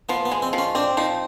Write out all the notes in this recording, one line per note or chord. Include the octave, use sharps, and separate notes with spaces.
F3 B3
B3
G#3
C4
F3
C#4
C4 D4
F3 D#4